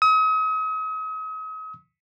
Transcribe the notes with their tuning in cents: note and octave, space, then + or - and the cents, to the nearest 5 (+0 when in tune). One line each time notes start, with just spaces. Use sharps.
D#6 +40